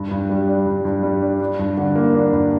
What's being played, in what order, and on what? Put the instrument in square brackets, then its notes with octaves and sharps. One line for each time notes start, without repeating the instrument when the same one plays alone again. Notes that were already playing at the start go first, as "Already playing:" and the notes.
Already playing: [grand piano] G2
G2
G3
D4
G2
G2
G3
D4
D4
G2
D3
A#3
D4
G2